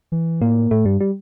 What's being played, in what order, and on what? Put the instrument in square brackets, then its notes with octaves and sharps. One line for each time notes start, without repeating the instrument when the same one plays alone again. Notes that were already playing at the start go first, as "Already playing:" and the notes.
[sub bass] E3
[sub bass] A2 [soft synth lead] A#3
[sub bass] A2 [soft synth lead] A3
[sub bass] G2 [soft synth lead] G3
[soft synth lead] G3